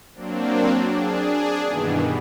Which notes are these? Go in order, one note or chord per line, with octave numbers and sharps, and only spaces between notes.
F#3 A#3 C4 D4
D4 G#4
G2 B2 D#3 E3 B3